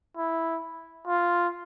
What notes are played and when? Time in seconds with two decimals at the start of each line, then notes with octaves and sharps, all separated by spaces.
0.17 E4
1.07 F4